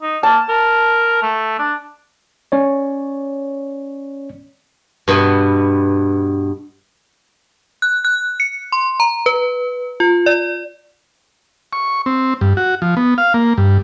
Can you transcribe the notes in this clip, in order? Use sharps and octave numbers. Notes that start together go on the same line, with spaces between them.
D#4
A#3 A5
A#4
A3
D4
C#4 C#5 D5
G2 B2 B3
F#6
F#6
C#7
C6
A#5
B4
F4
D5
C#6
C4
G2
F#4
F3
B3
F5
A#3
G2